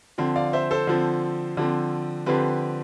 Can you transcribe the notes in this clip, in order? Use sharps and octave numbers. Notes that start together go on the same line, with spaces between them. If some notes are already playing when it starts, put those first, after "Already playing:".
D3 F3 C4
D5 F5
C5 E5
A4 C5
D3 F3 C4
D3 F3 C4
D3 F3 C4 G4 B4